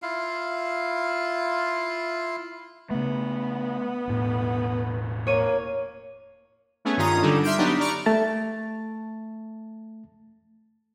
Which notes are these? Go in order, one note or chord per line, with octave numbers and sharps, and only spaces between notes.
E4 F4 F5
C#3 A3 B3
E1 A2
A#3 C#5 D#7
A3 B3 C#4 G#4
G2 D#3 C#4 F4 A#5 D#6
D3 G3 D4 D#4 A4
E5 C6 F6 G6 D7
F#3 B3 D4 D#4 G4
D5 A#5 C#6 F6 D7
A3 A5 A6